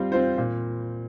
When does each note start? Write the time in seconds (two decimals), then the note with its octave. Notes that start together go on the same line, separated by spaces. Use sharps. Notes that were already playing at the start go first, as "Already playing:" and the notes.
Already playing: G3 C4 F4 C5
0.12 C4 F4 C5
0.38 A#2